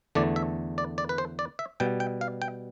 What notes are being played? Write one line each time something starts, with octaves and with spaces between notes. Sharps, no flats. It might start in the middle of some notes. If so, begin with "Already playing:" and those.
E2 D3 A3 D5
E5
D5
D5
B4
C5
D5
E5
B2 G3 G5
G5
F5
G5